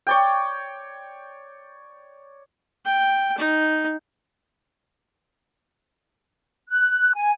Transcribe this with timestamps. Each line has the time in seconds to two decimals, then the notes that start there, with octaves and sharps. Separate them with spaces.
0.07 C#5 D5 G5
2.85 G5
3.38 D#4
6.69 F#6
7.14 G#5